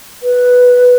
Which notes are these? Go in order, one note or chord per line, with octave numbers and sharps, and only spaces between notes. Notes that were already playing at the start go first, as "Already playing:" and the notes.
B4